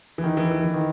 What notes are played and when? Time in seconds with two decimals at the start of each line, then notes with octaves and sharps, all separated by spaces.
0.18 E3
0.24 D#3
0.37 E3
0.52 E3
0.64 E3
0.74 D#3